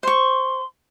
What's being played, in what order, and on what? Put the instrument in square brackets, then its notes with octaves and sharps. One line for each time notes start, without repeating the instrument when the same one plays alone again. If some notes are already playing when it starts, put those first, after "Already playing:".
[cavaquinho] C5 C#6 [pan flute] C6